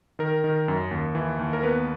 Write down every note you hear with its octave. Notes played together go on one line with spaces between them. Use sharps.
D#3 A#4
D#3
F#2
D#2
E3
D#2
A#4
B3 B4